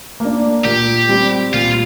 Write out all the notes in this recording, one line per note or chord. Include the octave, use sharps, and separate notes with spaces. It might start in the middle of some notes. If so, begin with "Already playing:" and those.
A#3 D4
A#2 G4
G3 C4
A#2 F4